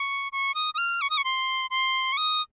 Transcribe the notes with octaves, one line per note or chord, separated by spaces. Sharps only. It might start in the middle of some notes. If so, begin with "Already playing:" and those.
Already playing: C#6
C#6
D#6
D#6
F6
C#6
D#6
C#6
C6
C6
C#6
D#6